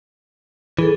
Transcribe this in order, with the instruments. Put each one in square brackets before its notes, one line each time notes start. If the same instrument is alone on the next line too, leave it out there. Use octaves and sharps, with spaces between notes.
[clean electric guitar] E3 [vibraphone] G#4 A4